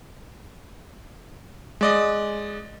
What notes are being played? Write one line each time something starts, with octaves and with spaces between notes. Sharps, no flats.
G#3 D5 D#5